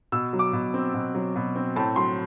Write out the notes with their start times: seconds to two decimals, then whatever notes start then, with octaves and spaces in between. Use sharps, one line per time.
0.12 B2 E6
0.33 F#3
0.39 D6
0.53 B2
0.74 C4
0.94 B2
1.15 F#3
1.35 B2
1.56 C4
1.76 A2 A5
1.96 F#3 C6